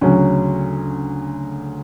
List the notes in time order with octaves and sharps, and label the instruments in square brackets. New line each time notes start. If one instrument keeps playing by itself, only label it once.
[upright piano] D2 C#3 F#3 C#4